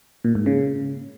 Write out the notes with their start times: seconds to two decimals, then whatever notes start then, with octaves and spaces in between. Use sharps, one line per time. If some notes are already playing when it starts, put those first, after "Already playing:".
0.24 A#2
0.35 G#2
0.46 C#3